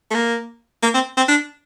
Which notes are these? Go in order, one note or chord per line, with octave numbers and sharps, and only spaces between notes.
A3
A#3
A#3
C4
C4
D4